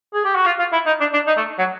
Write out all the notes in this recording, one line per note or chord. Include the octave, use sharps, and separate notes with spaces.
G#4
G4
F#4
F4
F4
E4
D#4
D4
D4
D#4
A3
F#3